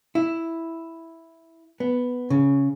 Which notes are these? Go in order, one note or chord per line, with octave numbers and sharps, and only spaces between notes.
E4
B3
C#3